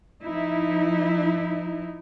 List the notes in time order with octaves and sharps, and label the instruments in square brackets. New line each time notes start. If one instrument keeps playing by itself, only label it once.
[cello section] F3 D#4 E4